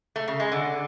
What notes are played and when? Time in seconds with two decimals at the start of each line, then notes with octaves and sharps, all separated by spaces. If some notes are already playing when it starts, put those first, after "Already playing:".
0.16 A3
0.28 C#3
0.40 G#3
0.52 D3